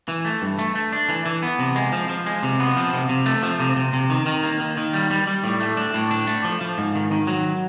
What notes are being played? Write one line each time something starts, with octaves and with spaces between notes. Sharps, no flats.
E3
A3
G2
A3
A3
D4
E3
E3
B3
C3
G#3
F3
F3
G#3
C3
B3
F3
C3
C3
A3
F3
C3
C3
C3
D#3
D#3
A#3
D#3
D#3
G3
G3
G3
A2
A3
D4
A2
D4
A3
F3
F3
G#2
D#3
D#3
F#3